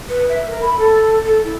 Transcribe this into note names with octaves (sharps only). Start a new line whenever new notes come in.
B4
E5
A#4
B5
A4
A4
E4